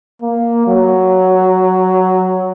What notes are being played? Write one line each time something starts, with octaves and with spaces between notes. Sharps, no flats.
A#3
F#3